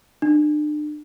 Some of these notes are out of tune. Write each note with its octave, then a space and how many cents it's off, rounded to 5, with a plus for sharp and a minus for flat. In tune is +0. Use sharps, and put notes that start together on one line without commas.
D4 +40